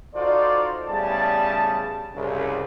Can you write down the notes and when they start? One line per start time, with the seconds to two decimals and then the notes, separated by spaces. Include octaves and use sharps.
0.14 D#4 F4 F#4 A4 C5 D5
0.88 A2 C#3 G3 B3 G#4 A5
2.14 C2 F#2 C#3